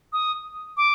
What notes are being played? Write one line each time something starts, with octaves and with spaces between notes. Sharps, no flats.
D#6
D6